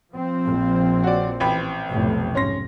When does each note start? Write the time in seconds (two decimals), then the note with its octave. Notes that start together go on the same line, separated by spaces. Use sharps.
0.13 F3 C4
0.45 A#1
1.03 F#4 C#5 D5
1.40 A1 G5 B5
1.90 F1 B1 A2
2.35 G#2 C#4 C6 A#6